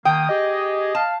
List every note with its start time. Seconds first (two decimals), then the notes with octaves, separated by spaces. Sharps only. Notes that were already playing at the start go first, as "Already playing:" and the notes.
0.05 D#3 A#3 G5 D#6
0.29 G4 G#4 D#5
0.95 F5 A5